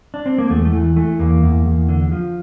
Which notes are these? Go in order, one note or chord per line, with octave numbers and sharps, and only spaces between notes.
D4
C4
A#3
E2 A3
A3
E3
E3 A3
E2 A#3
E2
E2
D3
F3